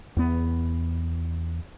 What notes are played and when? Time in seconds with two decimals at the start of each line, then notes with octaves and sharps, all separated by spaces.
0.17 E2 B3